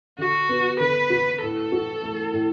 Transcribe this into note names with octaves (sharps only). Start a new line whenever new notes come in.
D3 F#4
B3
D3 B4
F#4
A2 A4
F#4
A3
A2